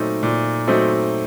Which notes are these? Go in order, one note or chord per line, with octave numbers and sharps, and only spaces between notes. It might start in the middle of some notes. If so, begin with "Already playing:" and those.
Already playing: A#2 F#3 A3 C4 D#4
A#2
F#3 A3 C4 D#4